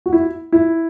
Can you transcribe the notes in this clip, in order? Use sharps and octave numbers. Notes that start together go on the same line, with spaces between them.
F#4
E4
E4